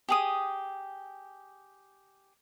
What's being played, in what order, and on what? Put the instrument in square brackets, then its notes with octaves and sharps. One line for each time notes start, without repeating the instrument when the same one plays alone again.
[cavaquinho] G4 G#4 D#6